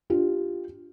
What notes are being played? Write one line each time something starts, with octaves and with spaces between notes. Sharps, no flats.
D4 F4 G4